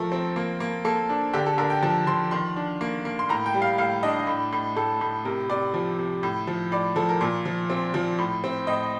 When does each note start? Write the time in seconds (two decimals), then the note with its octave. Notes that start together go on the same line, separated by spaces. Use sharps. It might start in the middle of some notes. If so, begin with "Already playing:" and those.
Already playing: F3 A3 A4 A#4
0.12 C4
0.36 A#3
0.60 A#3
0.85 A#3 A4
1.09 D4
1.33 D3 G4
1.46 A4
1.58 D3 A#4
1.70 G5
1.83 F3 A5
2.07 F3 C6
2.31 D#3 C6
2.56 D4
2.81 A#3
3.05 A#3
3.19 C6
3.29 A2 A#5
3.46 G5
3.54 G3
3.62 F5
3.78 A2 F5
4.03 D4 D#5
4.27 A2
4.52 A2
4.76 A2 A4
5.01 A2
5.25 C3 A#4
5.49 C3 D5
5.74 F3
5.99 C3
6.23 A2
6.47 F3
6.72 A2 D5
6.96 F3 A4
7.09 A#4
7.21 A#2
7.45 F3
7.70 C4
7.94 F3
8.18 A2
8.44 C4
8.67 A2 D#5